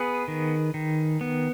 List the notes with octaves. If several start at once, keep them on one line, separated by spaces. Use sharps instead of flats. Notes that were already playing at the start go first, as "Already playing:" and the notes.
Already playing: B3 G#4 B4
D#3
D#3
B3